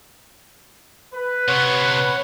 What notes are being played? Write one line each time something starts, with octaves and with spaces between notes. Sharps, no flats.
B4
C3 B3 C#5 F#5